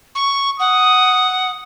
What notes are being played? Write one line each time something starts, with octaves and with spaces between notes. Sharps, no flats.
C#6
F#5 D#6